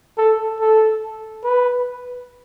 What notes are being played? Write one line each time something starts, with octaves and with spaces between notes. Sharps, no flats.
A4
A4
B4